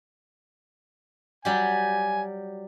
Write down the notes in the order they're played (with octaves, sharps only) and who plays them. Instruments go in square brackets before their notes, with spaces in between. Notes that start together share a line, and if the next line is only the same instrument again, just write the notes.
[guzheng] F#3 G3 G4 [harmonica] G#5